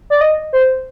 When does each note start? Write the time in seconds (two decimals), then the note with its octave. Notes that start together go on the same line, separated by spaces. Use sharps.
0.10 D5
0.21 D#5
0.53 C5